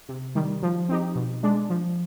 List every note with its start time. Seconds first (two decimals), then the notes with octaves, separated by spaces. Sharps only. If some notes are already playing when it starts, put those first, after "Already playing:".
0.09 C3
0.35 D#3 G3
0.63 F3
0.89 C4 D#4 G4
1.16 B2
1.43 G#3 D4
1.70 F3